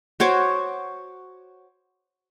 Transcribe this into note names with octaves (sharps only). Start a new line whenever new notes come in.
F#4 C5 C#5 D6